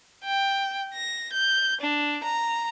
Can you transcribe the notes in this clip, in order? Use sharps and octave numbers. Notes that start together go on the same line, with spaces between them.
G5
A#6
G6
D4
A#5